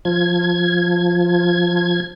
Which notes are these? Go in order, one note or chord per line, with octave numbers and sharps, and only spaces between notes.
F3 G#6